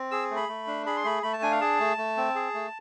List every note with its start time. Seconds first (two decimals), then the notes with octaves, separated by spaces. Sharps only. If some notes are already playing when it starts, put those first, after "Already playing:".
Already playing: C4
0.11 G#4 E6
0.31 A3
0.36 B5
0.49 A3
0.67 D4
0.86 G#4 B5
0.96 C6
1.04 A3 B5
1.23 A3 B5
1.33 A5
1.42 D4 G#5
1.51 F5
1.61 G#4 A5
1.80 A3
1.97 A3
2.17 C4
2.35 G#4
2.54 A3